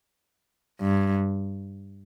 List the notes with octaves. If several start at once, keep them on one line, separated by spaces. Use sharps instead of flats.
G2